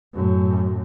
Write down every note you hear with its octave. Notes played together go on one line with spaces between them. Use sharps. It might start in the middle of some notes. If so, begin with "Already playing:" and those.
F#2 A2